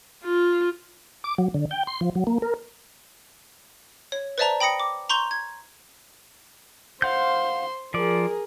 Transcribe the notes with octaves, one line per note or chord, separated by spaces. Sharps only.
F4
D6
F#3
D3
G5
C6
F3
F#3
A#3
A#4
C#5
B4 C5 D5 E5 A5 A#5
G5 B5 D#6 A#6 C#7
D6
A#5 C6 C#6 G6 F7
G#6
C5 F5 F#5 C6 G6
F3 G#4 A#4 D5